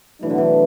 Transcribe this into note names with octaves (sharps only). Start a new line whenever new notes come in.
B2 E3 F#3 A3 D4
D3
E3